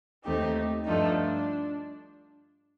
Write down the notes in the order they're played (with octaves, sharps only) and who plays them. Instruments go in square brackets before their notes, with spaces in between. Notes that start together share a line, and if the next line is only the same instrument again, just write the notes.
[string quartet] D#2 D#3 A3 C4 G4 [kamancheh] D#4
[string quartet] G2 F3 A3 D#4 [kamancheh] D4